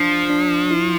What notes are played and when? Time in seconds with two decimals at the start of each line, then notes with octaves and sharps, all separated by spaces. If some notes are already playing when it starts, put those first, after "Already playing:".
Already playing: F3 D4
0.30 D4
0.71 E4